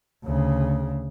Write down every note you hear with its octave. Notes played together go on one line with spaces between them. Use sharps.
D2 C#3